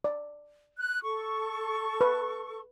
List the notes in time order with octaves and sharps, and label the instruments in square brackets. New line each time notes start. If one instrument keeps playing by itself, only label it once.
[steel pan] D5
[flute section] F#6
A4 C#6
[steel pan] B4